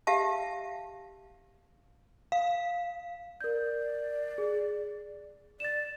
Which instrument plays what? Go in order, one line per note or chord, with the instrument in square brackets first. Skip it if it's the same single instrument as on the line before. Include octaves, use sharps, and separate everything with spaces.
[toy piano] G4 E5 F5 A5
[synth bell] F5
[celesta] A#4 G6 [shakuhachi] D5
[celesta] G#4
[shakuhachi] D5 [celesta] A6 E7